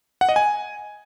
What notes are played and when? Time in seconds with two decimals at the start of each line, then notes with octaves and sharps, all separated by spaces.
0.21 F#5
0.29 D#5
0.36 G#5